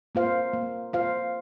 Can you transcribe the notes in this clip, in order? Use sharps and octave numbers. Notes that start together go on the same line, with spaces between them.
A#3 F4 C5 F5
A#3
F4 C5 F5